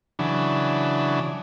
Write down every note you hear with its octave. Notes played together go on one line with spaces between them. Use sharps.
C#3 E3 F#3 D4